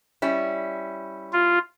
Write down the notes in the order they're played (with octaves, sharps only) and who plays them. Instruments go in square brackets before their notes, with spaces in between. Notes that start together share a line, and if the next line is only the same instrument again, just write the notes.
[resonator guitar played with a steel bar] G3 C#4 E4
[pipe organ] F4